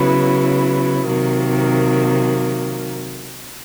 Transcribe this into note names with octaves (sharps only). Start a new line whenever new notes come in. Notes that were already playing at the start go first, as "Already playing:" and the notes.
Already playing: C#3 F#3 B3 E4
C3 D#3 F#3 A#3